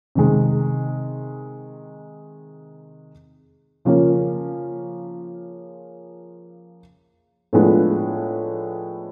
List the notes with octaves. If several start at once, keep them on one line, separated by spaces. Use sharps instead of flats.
C3 D#3 G#3
C#3 F3 A#3 C#4
A2 F3 G#3 B3 D4